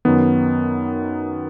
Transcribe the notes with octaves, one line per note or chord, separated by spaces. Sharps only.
F#2 D#3 B3